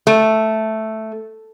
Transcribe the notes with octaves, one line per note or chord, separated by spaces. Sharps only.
A3